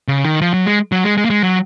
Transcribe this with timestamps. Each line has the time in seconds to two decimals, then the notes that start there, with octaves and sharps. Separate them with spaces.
0.08 C#3
0.25 D#3
0.42 F3
0.54 F#3
0.66 G#3
0.92 F#3
1.04 G#3
1.17 G#3
1.25 A#3
1.30 G#3
1.43 F#3